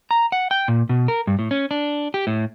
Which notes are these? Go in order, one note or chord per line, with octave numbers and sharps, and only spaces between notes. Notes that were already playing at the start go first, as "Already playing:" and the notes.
A#5
F#5
G5
A#2
B2
A#4
G2
A2
C#4
D4
G4
A2